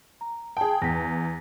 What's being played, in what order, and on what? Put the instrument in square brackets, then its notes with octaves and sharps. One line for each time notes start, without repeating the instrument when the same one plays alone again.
[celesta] A#5
[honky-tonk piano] G#4 G5 [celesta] A5
[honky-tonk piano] E2 [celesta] A#6 B6